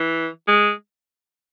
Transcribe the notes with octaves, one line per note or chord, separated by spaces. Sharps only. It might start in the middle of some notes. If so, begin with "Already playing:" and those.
Already playing: E3
G#3